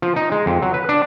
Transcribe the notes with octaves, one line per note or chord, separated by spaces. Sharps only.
F3
D#4
G#3
F2
F#3
B4
D4